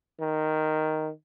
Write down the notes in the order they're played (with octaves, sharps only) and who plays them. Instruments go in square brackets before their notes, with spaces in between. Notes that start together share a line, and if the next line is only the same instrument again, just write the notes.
[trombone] D#3